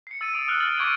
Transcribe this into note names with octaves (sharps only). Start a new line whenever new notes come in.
C7 C#7
E6 A6 C7 D#7
D#6 D7
D#6 F6 F#6 F#7
F6 A6 F#7
C#6 D6 G#6 D7 D#7